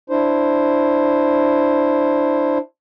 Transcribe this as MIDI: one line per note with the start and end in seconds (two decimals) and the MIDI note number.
0.10 2.58 62
0.10 2.58 64
0.10 2.58 72